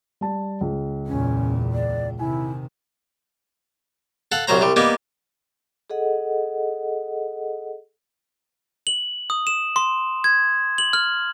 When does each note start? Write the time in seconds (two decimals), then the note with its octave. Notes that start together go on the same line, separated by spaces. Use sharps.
0.21 G3 A5
0.61 C#2
1.07 E2 A#2 C#4
1.73 D5
2.19 C3 D#3 E4 G#5
4.32 A4 F5 F#5
4.47 C2 F#2 F#3 C5 A#5
4.61 C2 G3
4.76 G3 A#3 B3 D#4
5.90 G#4 A4 D#5 F#5
8.87 F#7
9.30 D#6
9.47 E7
9.76 C6
10.24 G#6
10.78 F#7
10.93 F6